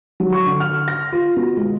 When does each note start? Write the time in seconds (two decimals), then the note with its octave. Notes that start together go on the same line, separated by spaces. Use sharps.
0.20 F#3
0.33 C#6
0.47 D3
0.60 F6
0.88 A#6
1.12 F4
1.37 B2
1.57 G#3